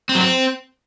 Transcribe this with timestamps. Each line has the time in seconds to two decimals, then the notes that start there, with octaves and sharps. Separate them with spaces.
0.09 C4
0.15 F#3
0.21 C4